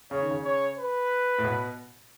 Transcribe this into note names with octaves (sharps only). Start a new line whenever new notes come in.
C#3 C#5
D#3
C#3
C#5
B4
A2
B2